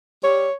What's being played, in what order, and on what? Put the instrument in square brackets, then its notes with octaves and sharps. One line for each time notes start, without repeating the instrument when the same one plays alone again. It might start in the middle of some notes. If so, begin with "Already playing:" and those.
[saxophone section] G3 C#5